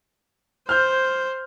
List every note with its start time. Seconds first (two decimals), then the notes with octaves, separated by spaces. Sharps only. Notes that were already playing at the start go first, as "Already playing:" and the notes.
0.69 C5 F6 G6